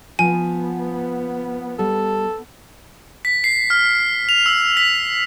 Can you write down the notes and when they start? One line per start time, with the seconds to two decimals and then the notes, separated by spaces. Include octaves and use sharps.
0.19 F3 B3 G#5
1.79 G3 A4
3.25 B6
3.44 C7
3.70 F6
4.29 F7
4.46 E6
4.77 B6